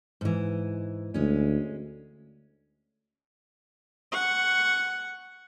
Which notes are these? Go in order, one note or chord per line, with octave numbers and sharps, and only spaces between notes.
G#2 E3
D2 G#3 C#4
F#5 C#6